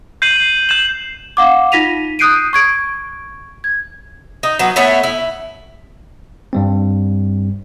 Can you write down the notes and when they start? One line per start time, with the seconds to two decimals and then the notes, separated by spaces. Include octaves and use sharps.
0.22 G6 C7 D#7 F#7
0.69 G6 E7 F#7
1.37 F5 F#5 D6
1.72 D#4 F4 A#6 B6 D#7 F7
2.19 D#6 F#6 G6 C7 D7 D#7
2.53 C#6 G#6 D7
3.64 G#6
4.43 D#4
4.59 F#3 B3
4.76 A3 B3 E4 C#5
5.03 E4
6.53 G2 G3 C4